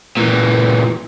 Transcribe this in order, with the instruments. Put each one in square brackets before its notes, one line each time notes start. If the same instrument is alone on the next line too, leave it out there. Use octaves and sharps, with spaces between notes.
[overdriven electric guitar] A#2 E3